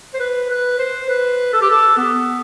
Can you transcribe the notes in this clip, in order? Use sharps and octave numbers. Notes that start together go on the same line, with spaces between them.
C5
B4
B4
C5
B4
A4
G4
A4
B3